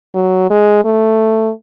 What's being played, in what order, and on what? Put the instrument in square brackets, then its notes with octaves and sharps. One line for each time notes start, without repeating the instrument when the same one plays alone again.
[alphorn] F#3
G#3
A3